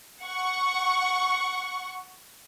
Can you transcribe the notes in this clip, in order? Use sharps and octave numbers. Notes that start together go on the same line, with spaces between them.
F#5 C#6